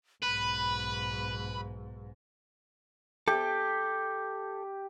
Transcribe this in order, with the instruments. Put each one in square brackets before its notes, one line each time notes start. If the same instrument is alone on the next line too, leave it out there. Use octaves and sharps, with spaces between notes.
[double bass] B1 G#2 [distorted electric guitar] B4 [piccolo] B5
[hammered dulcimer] G4 [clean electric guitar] A4